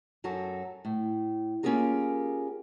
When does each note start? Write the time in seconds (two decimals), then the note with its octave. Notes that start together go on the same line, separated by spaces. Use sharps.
0.24 F#2 F#3 F#4 A4
0.85 A2
1.63 A#3 C#4 F4 G4 G#4 A#4